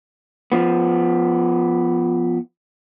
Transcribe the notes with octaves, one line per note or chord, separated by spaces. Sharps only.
F3 B3